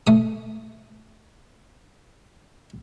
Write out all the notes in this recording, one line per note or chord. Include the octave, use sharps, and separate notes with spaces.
A3 D#6